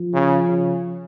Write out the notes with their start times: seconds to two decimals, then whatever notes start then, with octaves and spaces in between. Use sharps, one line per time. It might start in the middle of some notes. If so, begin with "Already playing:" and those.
Already playing: F3
0.14 C#3
0.48 C#3